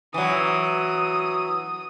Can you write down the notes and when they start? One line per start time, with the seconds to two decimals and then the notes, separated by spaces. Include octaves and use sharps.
0.14 E3 F#3 D#6